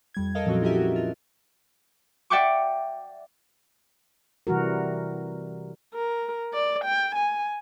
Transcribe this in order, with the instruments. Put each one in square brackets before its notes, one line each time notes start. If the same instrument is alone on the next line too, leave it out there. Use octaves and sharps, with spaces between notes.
[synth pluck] F2 G3 G#6
A4 A#4 D#5 F5
A#2 F3 F#3 C4 C#4 F#4
E4 F4 G4 A#4 D#5 E5
F#4
F4
[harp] D5 E5 F#5 G5 C#6 D6
[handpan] C3 E3 G3 F#4 A#4
[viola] A#4
D5
G5
G#5